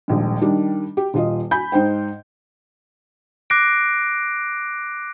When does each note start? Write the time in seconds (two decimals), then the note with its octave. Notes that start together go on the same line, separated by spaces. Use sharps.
0.08 D#1 A#1 G#2
0.42 D#3 G3 D4
0.97 G4
1.14 D#1 F4 D#5
1.51 G#5 B5 G6
1.72 G#2 D#4 C5 G5
3.50 D6 F#6 A#6 C7 D7